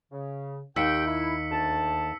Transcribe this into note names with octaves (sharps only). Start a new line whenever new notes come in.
C#3
D#2 G4 G5 E6 B6 C#7
E4
D2 A5